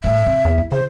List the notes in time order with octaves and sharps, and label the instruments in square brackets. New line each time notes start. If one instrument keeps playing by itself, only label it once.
[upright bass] A2 A3 [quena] E5
[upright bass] C3 C4
[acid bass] E2
[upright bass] E4
[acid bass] C#3 [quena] C5